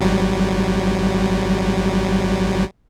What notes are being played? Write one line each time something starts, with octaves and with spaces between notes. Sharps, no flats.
G#1 F#3 G3